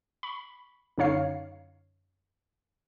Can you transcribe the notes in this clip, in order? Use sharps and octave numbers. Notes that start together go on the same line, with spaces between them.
B5 C#6
F#2 D3 D#4 C#5 F5 C7